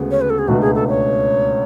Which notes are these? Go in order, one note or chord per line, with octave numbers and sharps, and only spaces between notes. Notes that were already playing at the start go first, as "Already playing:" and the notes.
Already playing: D2 C#3 G#3 B3
C#5
B4
A4
G#4
C#2 B2 A3 D4 F#4
G#4
A4
C#5